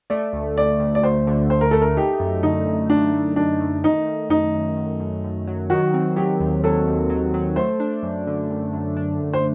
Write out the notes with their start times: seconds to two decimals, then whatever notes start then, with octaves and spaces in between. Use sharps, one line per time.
0.10 A3 D5
0.33 D2
0.57 D2 D5
0.80 D2
0.95 D5
1.03 D2 C5
1.27 D3
1.50 D2 C5
1.61 A#4
1.71 A3 A4
1.82 A#4
1.97 D#4 G4
2.20 F#2
2.43 D3 D#4
2.66 F#2
2.90 D3 D4
3.13 A3
3.36 F#2 D4
3.60 A3
3.84 D#3 D#4
4.06 D#3
4.30 F#2 D#4
4.54 F#2
4.77 F#2
5.00 F#2
5.24 F#2
5.47 F#3
5.70 D#3 F#4
5.94 C4
6.16 F#3 G4
6.40 D#2
6.64 F#3 A4
6.87 D#2
7.10 F#3
7.34 F#3
7.56 A3 C5
7.80 D4
8.03 F#2
8.27 D3
8.50 F#2
8.73 F#2
8.97 D4
9.20 F#2
9.34 C5